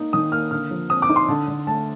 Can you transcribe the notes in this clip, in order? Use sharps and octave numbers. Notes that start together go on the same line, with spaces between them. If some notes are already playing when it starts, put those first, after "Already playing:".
Already playing: A#3 D#4
D#3 D#6
A#3 F6
D3 F6
F3
C4 D#6
D6
D#4
C6
D3 A5
D3
A3 A5